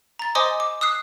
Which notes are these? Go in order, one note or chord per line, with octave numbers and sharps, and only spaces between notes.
A#5 A6
C5 D#5 G#5 C6 D6 D#6
D6
D#6 E6 F#6 C7